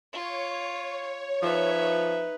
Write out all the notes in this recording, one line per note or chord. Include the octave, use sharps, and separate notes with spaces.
F4 C#5
F3 D#4 B4 E5